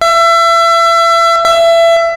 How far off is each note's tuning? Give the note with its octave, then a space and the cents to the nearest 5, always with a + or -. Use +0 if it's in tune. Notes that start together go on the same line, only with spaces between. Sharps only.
E5 +30
E5 +25